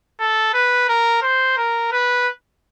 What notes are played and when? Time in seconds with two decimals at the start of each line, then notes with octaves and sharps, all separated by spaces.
0.20 A4
0.54 B4
0.88 A#4
1.22 C5
1.57 A#4
1.92 B4